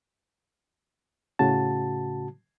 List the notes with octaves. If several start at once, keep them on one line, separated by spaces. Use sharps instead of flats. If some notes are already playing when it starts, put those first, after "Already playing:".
A2 C#3 F#4 A5